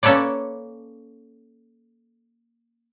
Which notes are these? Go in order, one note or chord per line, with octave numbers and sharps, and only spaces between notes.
A#3 C#4 A4 B4 C#5 D5